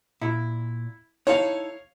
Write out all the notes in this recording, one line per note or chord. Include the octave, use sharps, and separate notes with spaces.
A#2 E4
D#4 E4 A4 C#5 F5